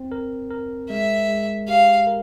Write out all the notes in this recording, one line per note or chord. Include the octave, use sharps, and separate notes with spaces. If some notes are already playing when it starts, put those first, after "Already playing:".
Already playing: C4
A#4
A#4
G#3 E5
G#3
G4 F5
A#4